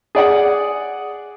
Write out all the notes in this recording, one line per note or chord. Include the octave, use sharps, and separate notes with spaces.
G#4 D5 F#5